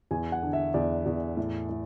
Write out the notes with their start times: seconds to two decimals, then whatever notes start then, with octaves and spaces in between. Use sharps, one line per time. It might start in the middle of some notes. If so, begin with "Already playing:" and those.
0.11 E2 G#5
0.32 F#5
0.43 D3
0.53 E5
0.74 E2 D5
1.06 E2
1.37 A2
1.69 A2